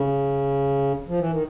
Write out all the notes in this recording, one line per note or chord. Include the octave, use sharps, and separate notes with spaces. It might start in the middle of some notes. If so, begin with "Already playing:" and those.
Already playing: C#3
F3
E3
D#3